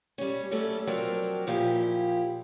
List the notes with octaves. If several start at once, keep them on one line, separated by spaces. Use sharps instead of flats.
G3 C#4
F#3 G3 A3 C#4 A4
F3 F#3 C4 D4 A#4 D5
A#2 F3 E4 G4